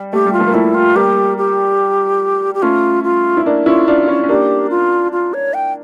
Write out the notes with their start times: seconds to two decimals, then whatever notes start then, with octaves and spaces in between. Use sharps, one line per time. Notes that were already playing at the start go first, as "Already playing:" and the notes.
Already playing: G3
0.13 A3 G4
0.26 G3
0.33 F4
0.39 F3 A3
0.47 A#3
0.54 F3 A3 E4
0.75 F4
0.95 G3 A#3 G4
1.38 G4
2.55 G4
2.62 A3 C#4 F4
3.04 F4
3.37 E4
3.46 A#3 D4
3.66 C#4 E4 F4
3.88 D4 F4
4.03 F4
4.08 C#4 E4
4.23 C#4
4.28 A#3 D4 G4
4.71 F4
5.12 F4
5.34 C#5
5.54 G5